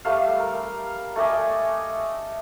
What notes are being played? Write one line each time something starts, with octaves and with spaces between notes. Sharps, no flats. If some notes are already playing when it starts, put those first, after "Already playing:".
G3 A3 F5
A#4
A3 D5 D#5 G#5